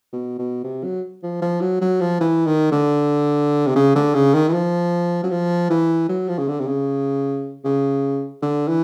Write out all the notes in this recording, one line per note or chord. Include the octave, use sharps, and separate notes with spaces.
B2
B2
C3
F#3
F3
F3
F#3
F#3
F3
E3
D#3
D3
C3
C#3
D3
C#3
D#3
E3
F3
F#3
F3
E3
F#3
F3
C#3
D3
C3
C#3
C#3
D3
E3